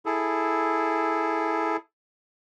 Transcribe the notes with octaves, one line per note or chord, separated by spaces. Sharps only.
E4 G#4 A4